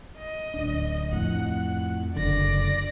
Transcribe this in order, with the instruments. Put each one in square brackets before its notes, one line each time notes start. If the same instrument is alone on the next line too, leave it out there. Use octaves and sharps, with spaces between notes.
[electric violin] D#5
[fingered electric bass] D1 D4
[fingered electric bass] F2 A2 [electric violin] F#5
[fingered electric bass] F#1 D3 [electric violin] D5 A#6